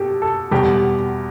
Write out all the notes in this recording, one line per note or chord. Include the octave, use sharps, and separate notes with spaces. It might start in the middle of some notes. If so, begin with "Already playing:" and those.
Already playing: B2 G4 A4
A4
E2 B2 G3 G4